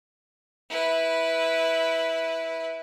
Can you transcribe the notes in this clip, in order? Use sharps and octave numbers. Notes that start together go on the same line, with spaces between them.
E4 B4